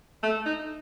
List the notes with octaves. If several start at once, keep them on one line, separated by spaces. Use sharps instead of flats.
A3
D#4